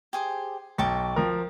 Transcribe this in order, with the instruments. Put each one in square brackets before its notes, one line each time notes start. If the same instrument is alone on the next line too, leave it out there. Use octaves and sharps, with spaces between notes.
[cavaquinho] G4 G#4 C5
[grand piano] B1 [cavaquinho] G5 A5 C#6
[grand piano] F3 A#4